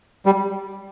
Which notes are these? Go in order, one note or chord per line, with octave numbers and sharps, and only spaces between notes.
G3